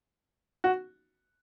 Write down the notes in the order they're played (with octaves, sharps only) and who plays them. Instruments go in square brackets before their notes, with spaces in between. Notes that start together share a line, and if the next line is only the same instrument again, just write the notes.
[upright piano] F#4